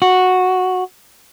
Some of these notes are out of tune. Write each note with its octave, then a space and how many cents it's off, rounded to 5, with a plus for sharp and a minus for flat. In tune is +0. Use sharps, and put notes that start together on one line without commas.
F#4 -5